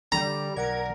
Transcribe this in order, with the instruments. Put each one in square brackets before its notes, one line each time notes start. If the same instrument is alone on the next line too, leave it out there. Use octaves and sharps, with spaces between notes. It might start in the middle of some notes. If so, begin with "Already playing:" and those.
[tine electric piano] D3 [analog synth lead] G3 [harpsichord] A#5
[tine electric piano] B1 D5 F#5 [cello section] A#4 [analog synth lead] G#6